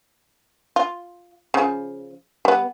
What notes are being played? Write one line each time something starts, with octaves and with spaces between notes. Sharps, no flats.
F4
C#3 F3
G3 B3